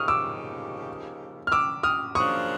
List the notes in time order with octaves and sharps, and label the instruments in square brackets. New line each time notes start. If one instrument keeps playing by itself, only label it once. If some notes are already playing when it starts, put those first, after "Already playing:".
Already playing: [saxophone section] C#3 F3 A#3 D#4 G4 [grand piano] C#6 D#6 F6
[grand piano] D6 E6
F6
D6 E6
D#6 F6
[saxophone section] F#2 C#3 F3 A#3 D4 [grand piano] C#6 D#6